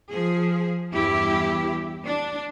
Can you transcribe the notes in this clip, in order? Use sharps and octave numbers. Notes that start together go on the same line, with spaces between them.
F3 G#4
E2 G2 E4 G4
D4